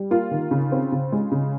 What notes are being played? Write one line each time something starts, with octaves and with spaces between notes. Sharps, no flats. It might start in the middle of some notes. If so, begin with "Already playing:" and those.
Already playing: G3
A#3 F4
D#3
C#3
C4
C#3
G#3
C#3